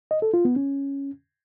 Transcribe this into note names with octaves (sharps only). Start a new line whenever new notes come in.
D#5
A4
F4
B3
C#4